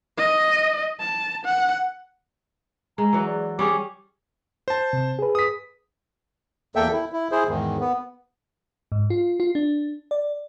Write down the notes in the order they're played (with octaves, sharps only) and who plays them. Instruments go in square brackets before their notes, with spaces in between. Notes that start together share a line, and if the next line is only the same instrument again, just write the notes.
[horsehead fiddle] D#5
A5
F#5
[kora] G#3 [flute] A#5
[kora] E3 F#3
[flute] D5
[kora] G3 C#4 G#4 [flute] D6
[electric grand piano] C5 A5
[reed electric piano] C3
G#4 B4
[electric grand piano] D#6 B6
[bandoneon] E2 A#3 A4 E5 G5
E4
E4
E4 G#4 C5
E2 G#2 D#3
B3
[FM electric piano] G#2
F4
F4
D4
D5